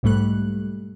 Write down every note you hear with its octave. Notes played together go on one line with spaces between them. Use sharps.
B1 G#2 G3 A3 F#6